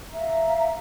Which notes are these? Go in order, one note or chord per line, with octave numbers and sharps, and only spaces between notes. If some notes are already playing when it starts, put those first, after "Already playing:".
E5 F5 A#5